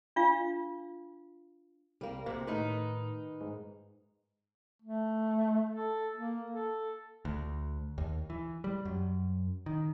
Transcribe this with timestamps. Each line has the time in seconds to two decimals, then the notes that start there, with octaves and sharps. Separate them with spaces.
0.16 D4 F4 F5
2.01 C2 G3 A#3
2.26 D2 C3 A#3
2.47 A2 D#3 D#4 B4
3.41 G#2
4.82 A3
5.69 A4
6.15 A#3
6.50 A4
7.25 D2
7.98 D#2
8.30 E3
8.64 G3
8.85 F#2
9.66 D#3